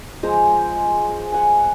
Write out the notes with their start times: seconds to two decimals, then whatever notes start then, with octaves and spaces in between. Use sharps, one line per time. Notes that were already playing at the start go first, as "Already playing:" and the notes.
0.23 F3 G#3 C5 A#5
1.32 F#5 G#5